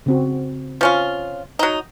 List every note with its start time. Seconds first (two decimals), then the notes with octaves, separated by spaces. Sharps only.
0.06 C#3 C4 F#4
0.81 F3 C#4 F4
1.59 F#3 D#4